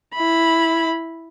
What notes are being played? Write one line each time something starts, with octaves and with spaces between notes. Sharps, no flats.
E4 B5